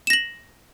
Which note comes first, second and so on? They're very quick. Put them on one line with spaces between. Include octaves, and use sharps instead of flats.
E7 A#6 F#7